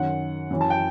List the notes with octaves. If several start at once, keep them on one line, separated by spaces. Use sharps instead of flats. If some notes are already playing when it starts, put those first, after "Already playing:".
Already playing: F#2 D#3 F#5
F#2 E3
A5
G5